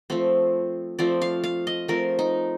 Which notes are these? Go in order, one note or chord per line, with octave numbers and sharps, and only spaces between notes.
F3 A3 C4
F3 A3 C4 D5
F5
F5
D#5
F3 A3 C4 A#4
D#4